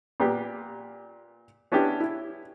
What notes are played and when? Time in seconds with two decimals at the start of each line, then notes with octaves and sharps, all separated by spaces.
0.20 A#2 B3 G4
1.72 B3 C#4 D4 E4 G4
2.00 E4